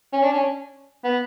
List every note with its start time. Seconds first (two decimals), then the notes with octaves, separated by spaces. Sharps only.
0.13 C#4
0.23 D4
0.33 C#4
1.04 B3